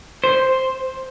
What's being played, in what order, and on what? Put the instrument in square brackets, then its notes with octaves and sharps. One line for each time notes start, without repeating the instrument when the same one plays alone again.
[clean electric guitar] C5